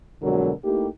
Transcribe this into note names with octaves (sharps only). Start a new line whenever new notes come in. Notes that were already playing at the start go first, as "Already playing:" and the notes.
F2 B2 D3 F#3 G#3 A#4
A3 A#3 D#4 E4 G4